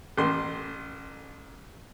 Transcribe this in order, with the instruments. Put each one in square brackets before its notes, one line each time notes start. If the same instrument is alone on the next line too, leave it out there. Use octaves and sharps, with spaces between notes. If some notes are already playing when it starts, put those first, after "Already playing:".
[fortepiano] A1 C6